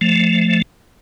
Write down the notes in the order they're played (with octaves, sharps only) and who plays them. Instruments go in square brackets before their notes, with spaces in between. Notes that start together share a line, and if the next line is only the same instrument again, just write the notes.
[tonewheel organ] F3 A3